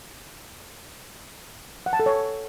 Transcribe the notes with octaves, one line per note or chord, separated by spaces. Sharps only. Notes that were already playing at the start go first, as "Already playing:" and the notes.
F#5
A5
A4
C#5